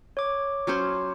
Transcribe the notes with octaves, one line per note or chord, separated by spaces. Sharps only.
C#5 D6
F#3 C#4 C5